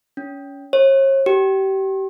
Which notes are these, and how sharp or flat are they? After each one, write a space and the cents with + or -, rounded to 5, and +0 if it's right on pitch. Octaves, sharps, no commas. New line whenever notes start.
C#4 +20
C#5 -40
G4 -30